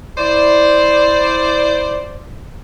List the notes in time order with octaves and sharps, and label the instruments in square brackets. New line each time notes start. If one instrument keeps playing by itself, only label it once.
[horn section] E4 C5 D5